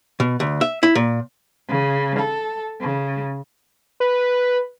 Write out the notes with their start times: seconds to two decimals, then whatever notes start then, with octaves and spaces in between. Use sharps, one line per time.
0.20 B2
0.40 D2
0.61 E5
0.83 E4
0.95 A#2
1.68 C#3
2.19 A4
2.81 C#3
4.00 B4